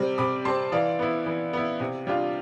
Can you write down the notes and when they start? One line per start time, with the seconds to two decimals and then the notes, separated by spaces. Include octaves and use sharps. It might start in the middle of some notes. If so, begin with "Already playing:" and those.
Already playing: C3 G3 C4 D6
0.18 C3 B5 D6
0.45 G3 C4 A5 C6
0.72 E3 D5 F5
0.99 B3 E4
1.26 E3
1.53 B3 E4
1.80 C3
2.07 G3 D4 F4